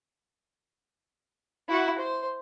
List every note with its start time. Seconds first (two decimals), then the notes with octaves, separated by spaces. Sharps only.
1.69 E4 F#4
1.98 C5